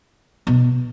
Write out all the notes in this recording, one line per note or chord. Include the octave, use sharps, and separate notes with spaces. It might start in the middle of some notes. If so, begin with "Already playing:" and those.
B2